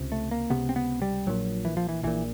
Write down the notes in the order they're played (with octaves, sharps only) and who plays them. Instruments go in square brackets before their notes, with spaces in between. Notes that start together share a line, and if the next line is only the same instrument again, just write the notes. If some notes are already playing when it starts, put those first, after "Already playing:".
Already playing: [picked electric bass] C#2 C3
A3
A#3
C#2 C3 B3
C4
B3
G3
A#1 A#2 F#3
E3
F3
E3
A#1 A#2 E3